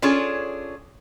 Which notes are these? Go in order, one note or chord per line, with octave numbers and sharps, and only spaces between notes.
C#4 D4 F4 G#4 A4 C#5